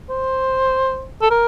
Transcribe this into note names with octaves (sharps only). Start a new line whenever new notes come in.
C5
A4
A#4